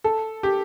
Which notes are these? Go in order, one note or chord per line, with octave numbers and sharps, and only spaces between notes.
A4
G4